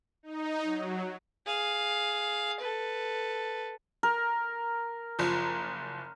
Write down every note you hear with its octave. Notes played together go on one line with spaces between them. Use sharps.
D#4
F#3
G#4 F5
A4 B4
A#4
F#1 F3